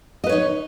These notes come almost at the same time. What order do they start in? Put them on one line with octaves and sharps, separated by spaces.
D#5 B4 C#5 D#4